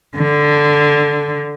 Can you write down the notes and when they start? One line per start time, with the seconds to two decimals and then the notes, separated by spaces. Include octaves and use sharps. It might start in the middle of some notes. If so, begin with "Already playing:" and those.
0.16 D3